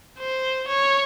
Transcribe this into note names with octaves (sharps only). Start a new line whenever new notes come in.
C5
C#5